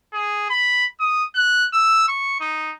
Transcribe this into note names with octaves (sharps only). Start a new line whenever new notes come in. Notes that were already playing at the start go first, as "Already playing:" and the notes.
G#4
B5
D#6
F#6
E6
C#6
D#4